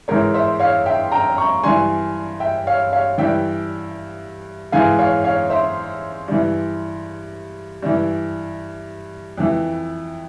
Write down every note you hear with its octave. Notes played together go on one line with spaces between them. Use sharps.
G#2 E3 A#4 C#5
C5 E5
C#5 F5
E5 G5
G5 A#5
A#5 C#6
G2 E3 G#5 C6
E5 G5
C#5 F5
C#5 F5
G2 E3 E5 G5
G#2 E3 F5 G#5
C#5 F5
C#5 F5
C5 E5
G2 E3
G2 E3
F2 E3